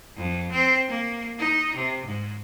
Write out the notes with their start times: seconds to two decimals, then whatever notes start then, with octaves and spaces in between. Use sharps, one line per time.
0.16 F2
0.52 C4
0.87 A#3
1.38 D#4
1.75 C3
2.05 G#2